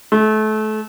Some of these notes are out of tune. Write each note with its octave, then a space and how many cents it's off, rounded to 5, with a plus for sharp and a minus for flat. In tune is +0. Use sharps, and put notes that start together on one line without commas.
A3 -30